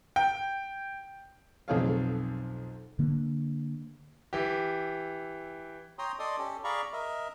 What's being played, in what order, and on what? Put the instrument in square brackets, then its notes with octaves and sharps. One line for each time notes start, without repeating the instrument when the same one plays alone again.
[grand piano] G5
[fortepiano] B1 F2 G#4 A4 C#5 F5
[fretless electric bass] D3 A#3
[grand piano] E3 G4
[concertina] C#5 G5 A#5 C6 D#6
A4 D5 D#5 C6 D#6
C#4 G4 A4
G#4 D5 F5 A#5 B5 C#6
A#4 D#5 E5